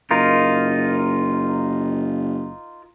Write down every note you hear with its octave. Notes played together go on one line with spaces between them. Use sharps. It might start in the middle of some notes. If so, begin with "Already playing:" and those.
F#1 D#4 F4 A#4